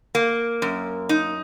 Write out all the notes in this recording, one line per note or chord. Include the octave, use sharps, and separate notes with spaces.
A#3
F#2
D#4